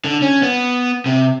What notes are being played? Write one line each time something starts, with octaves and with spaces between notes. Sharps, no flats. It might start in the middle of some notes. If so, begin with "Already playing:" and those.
D3
C#4
B3
C3